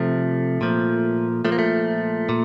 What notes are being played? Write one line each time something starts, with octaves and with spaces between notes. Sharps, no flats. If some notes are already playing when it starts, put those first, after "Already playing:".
Already playing: C3 F3 A3
A#2 F3
A#2 F3 A3
A#3
A3
A#2